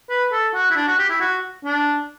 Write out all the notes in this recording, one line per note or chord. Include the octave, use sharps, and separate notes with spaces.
B4
A4
F#4
E4
D4
F#4
G4
E4
F#4
D4